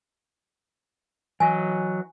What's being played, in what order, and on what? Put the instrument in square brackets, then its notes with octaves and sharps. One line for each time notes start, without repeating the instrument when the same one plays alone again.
[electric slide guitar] E3 F#3 D#5 [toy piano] G#5